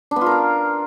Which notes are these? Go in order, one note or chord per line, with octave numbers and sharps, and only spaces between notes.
D4
B3
F4
A#4
F5